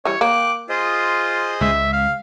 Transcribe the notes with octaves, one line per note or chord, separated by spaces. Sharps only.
E3 G3 C#5
A#3 G5 D6 F#6
F4 G#4 C5 D#5
C#2 C#3 G#3 E5
F5